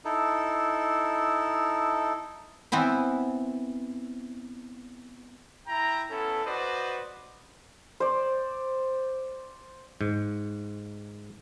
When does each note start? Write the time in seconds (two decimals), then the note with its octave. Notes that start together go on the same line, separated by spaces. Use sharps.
0.05 D#4 E4 A4
2.72 E3 B3 C4 E4
5.67 E4 G5 A#5
6.11 B3 C#4 E4 A4
6.45 F#4 B4 C5 D5 D#5
8.00 C5 D5
10.01 G#2